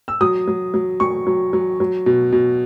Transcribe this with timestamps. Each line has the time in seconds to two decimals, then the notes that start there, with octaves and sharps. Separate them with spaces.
0.08 E6
0.21 F#3 D#6
0.48 F#3
0.74 F#3
1.00 F#3 C#6
1.27 F#3
1.53 F#3
1.80 F#3
2.06 B2
2.32 B2